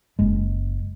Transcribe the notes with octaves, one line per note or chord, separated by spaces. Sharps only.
F#1 G#3